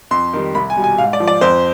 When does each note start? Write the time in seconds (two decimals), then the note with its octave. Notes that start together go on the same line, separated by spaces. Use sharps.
0.11 F2 C6
0.33 D#3 G3
0.55 C2 B5
0.70 G#5
0.77 B2 G3
0.84 G#5
0.98 G#2 F5
1.13 D5
1.20 F3
1.27 D5
1.41 F2 C5